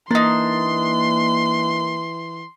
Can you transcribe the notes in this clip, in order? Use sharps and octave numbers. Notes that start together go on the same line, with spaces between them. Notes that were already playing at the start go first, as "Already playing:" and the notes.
E3 A#3 D4 D#4 C6